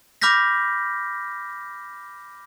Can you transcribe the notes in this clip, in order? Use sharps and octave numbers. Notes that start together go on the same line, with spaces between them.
B5 D6 F6 G6 A#6 B6